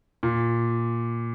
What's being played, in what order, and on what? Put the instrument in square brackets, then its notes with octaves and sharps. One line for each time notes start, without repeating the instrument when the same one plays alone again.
[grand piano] A#2